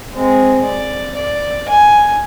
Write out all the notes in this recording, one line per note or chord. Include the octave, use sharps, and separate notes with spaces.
G#3 C4
D5
D5
G#5